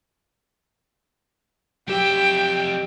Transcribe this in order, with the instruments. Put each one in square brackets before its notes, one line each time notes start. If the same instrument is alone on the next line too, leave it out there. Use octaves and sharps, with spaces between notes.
[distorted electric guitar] F2 E5 [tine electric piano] F#3 G4 [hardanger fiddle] G5